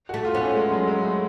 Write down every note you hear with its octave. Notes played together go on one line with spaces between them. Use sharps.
F#4
A3
F4
B3 C#4
A3
G#3
F#3
G#3
A3